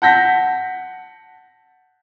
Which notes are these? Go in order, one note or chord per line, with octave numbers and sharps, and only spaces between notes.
F#5 A5 G6 A#6 B6